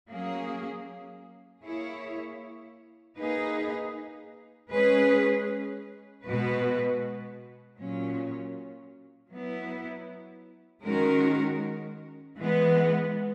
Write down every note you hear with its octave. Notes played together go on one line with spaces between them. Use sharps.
F#3 A#3 C#4 G#4
A#3 E4 G#4 C#5
A#3 D#4 G#4 B4
G#3 C#4 G#4 B4
B2 G#3 B3 F#4 B4
A#2 F#3 C#4
F#3 B3 E4
D#3 G#3 C#4 F#4 A#4
E3 G#3 B3